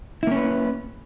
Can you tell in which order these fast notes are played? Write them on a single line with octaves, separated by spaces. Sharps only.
E4 A#3 C#4 B4